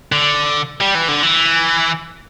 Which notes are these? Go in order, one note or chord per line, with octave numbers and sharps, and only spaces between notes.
D3
G3
E3
D3
E3